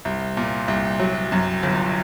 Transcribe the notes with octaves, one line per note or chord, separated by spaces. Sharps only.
C2
A#2
C2
F#3
F#2
G1